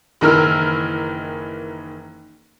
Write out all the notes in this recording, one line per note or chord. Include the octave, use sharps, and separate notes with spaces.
F#1 D#3 E3 A#4 E6 F6